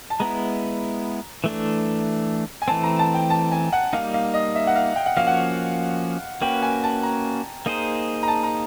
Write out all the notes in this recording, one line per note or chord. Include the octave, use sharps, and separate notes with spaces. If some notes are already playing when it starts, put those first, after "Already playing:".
A5
G#3 B3 E4 A#5
E3 A3 D4
G#5
E3 A3 C4 A5
A#5
A5
G5
A5
G#5
F#5
G3 A#3 D#4 F5
F5
D#5
E5
F#5
F5
G5
F#5
F3 A#3 C#4 F#4 F5
F#5
A#3 C#4 F#4 B4 G5
G#5
A5
A#5
A#3 D#4 G#4 C5
A#5
A5
A#5